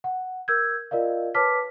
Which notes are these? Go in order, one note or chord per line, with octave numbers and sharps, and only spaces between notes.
F#5
A#4 E6 G6 G#6
F4 A#4 D5 D#5 F5
B4 C#5 A5 D6 F6 B6